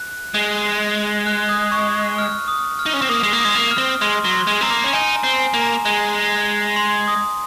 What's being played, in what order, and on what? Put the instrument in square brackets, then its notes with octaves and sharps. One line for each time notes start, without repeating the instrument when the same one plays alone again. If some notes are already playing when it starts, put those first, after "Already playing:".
Already playing: [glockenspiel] F#6
[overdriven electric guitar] G#3
[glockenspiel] F#6
D#6
C#6
F6
D#6
F6
[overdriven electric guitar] D#4
C#4
C4
[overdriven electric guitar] A#3 [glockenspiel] D#6
[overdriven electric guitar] G#3
A#3
[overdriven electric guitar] G#3 [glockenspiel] D#6
[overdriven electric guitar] A#3
[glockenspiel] F6
[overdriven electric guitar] C4
[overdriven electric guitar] G#3 [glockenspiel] C6
[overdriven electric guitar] F#3
[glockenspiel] C6
[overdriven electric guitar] G#3
[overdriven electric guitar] C4 [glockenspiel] A#5
[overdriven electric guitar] A#3
C#4
[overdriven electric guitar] D#4 [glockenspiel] G#5
[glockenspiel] A#5
[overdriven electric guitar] C4
[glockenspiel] G#5
[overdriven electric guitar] A#3
[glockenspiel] A#5
[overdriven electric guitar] G#3
[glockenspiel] C6
D#6